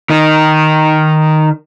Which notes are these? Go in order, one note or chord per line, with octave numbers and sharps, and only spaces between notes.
D#3 D#4